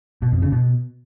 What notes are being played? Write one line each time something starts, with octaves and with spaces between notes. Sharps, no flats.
B2
F2
C#3
B2